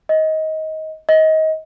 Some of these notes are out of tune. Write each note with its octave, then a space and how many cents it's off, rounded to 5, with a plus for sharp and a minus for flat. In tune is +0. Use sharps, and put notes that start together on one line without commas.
D#5 +20
D#5 +25